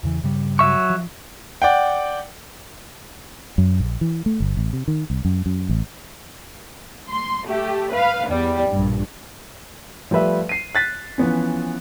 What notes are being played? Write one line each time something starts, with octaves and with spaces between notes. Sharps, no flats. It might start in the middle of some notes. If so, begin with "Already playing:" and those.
E2 C#3 E3
G2 C#3 G3
F#3 E5 C#6
F3
D5 F#5 G5
F#2
A#1
E3
A3
G1
A1
C3
D#3
C2
F#2
F#2
A1
C6
A3 G4
B4 F5
E2 G3
A#1 G2
F3 G3 A3 B4 E5
C7 D#7
F#6 A6 B6
E3 F3 B3 C#4